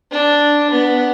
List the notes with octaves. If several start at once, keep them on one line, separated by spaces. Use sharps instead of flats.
D4
B3